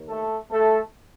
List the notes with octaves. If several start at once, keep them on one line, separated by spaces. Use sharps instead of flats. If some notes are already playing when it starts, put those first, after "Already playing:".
Already playing: D#2 D#3
A3 A4
A3 A4